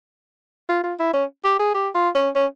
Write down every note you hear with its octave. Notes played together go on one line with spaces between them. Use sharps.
F4
F4
E4
C#4
G4
G#4
G4
F4
C#4
C#4